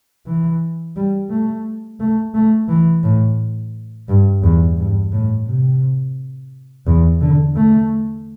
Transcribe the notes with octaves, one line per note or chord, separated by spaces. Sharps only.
E3
G3
A3
A3
A3
E3
A2
G2
E2
G2
A2
C3
E2
D3
A3